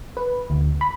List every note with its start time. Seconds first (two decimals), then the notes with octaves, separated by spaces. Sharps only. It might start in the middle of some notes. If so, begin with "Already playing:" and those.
0.17 B4
0.50 D2
0.81 B5